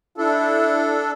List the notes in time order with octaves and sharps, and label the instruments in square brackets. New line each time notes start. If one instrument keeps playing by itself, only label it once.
[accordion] D4 A4 [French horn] E4